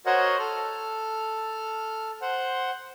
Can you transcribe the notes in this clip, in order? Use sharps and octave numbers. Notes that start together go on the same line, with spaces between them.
F#4 A#4 C5 C#5 D#5 F#5
A4 F6
C5 F#5